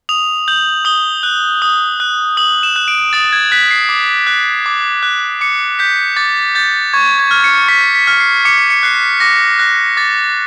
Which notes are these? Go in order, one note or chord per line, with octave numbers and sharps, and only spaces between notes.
D#6 F7
G6 F#7
D#6 G7
F#6
D#6
F#6
D#6 F#7
E7
F#6
D7
D#6 A6
G#6
F#6 B6
C7
D6
F#6
D6
F#6
D6 C#7
G6 B6
D6 A6
G6 A6
C#6 G#6
G#6
F6
C#7
C#6 B6
B6
F6
C7
D6 C#7
C#7
F#6 C7
B6
D6 A#6
F#6 A#6
D6 A6